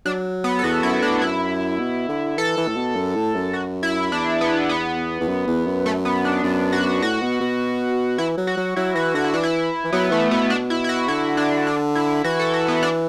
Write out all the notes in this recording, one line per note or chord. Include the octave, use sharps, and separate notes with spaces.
F#3 D4
B3
A4
E2 F#4
F#2 E4
A2 D4
F#2 E4
B2
D3
E3 A4
E3
A2
B2
F#2
A2
F#2
F#4
E4
E2 D4
B3
B3
E2
F#2
E2
F#2
A3
B3
D4
F#2
F#4
A2 F#4
B2
B2
E3 E4
F#3
F#4
F#3
F#3 E4
E3 F#4
D3 F#4
E4
E3 D4
E4
E3
F#3 B3
E3 A3
B2 B3
D4
E4
E4
F#4
D3 E4
D4
D4
E4
E3 F#4
A4
F#4
B3
D4